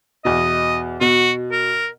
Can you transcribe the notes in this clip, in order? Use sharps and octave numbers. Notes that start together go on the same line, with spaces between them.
E2 B2 D#5
B2 F#4
A#4